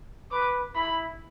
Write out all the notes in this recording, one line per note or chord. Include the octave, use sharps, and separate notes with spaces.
B4 D6
E4 B5